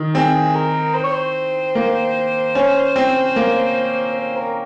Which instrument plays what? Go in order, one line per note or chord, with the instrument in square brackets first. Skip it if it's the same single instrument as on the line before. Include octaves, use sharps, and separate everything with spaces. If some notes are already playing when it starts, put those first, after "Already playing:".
Already playing: [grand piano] D#3
[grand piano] C4 [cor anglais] G#4
[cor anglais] A#4
C5
C#5
C5
[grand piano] A#3
C#4
C4
A#3
[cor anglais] C5
A#4